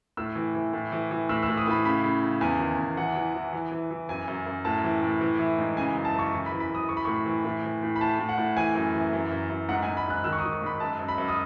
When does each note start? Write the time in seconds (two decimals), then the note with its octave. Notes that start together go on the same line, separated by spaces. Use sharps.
0.17 A2 E6
0.35 E3
0.55 E3
0.73 A2
0.92 E3
1.11 E3
1.29 A2 E6
1.43 E6
1.48 A2
1.57 D#6
1.67 A2 B5
1.85 C#3 B5
2.04 C#3
2.23 C#3
2.41 E2 G#5
2.59 D#3
2.78 E2
2.97 E3 F#5
3.15 E3
3.34 E3
3.53 E3
3.71 E3
3.91 E3
4.09 F#2 G#5
4.28 F#2
4.46 F#2
4.65 A2 A5
4.84 E3
5.03 A2
5.21 E3
5.39 E3
5.58 G#2
5.77 C#3 G#5
5.95 F#2
6.05 A5
6.14 F#2 C#6
6.33 E3 C#6
6.46 B5
6.52 E3
6.60 B5
6.70 F#2 D#6
6.89 E3 C#6
6.97 B5
7.05 A2 C#6
7.26 E3
7.44 A2
7.64 E3
7.83 A2
7.96 B5
8.01 A2 A5
8.19 A2
8.29 F#5
8.38 A2
8.57 E3 G#5
8.75 F#2
8.94 E3
9.13 F#2
9.31 F#2
9.50 F#2
9.69 G#2 F#5
9.82 G#5
9.87 G#2
9.97 B5
10.07 G#2 F#6
10.24 D#3 E6
10.33 C#6
10.39 D#6
10.44 D#3
10.53 C#6
10.62 G#2 B5
10.80 F#2 A5
10.99 F#2
11.08 B5
11.18 F#2
11.28 D#6